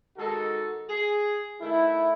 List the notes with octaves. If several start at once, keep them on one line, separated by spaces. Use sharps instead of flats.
D#3 G#3 D#4 F#4 A4
G#4
D#3 A3 E4